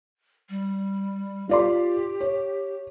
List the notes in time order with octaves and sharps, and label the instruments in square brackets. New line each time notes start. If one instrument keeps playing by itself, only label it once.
[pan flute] G3
[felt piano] F4 D5 C6 [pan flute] G4
[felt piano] C#5